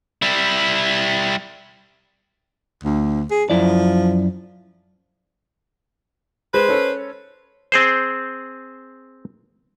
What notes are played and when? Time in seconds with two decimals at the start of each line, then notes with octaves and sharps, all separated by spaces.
0.22 G3 E4
2.84 D2
3.31 G#4
3.50 F#2 F3 E4 D5
6.54 G#3 B4 C5
6.69 C#4 A4 C#5
7.72 C4 G#4 C5